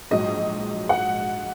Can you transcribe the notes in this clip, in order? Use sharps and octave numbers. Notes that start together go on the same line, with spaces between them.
A#1 G#2 F#3 D#5
F#5